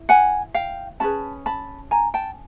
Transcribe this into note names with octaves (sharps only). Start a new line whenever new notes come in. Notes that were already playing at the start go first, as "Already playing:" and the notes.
Already playing: E4
F#5 G#5
F5 G5
C#4 F4 G#4 B4 A5 B5
A5 B5
G#5 A#5
G5 A5